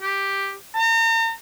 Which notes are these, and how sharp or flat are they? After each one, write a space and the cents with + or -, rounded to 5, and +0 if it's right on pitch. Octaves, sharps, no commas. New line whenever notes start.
G4 +5
A#5 -40